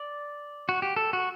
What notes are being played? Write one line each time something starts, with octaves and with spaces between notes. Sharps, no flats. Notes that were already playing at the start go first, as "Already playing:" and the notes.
Already playing: D5
F#4
G4
A4
F#4